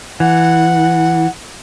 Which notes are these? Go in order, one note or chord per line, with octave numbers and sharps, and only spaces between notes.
E3 F#5